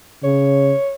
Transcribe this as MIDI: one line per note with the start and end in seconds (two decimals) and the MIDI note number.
0.24 0.73 49
0.24 0.95 73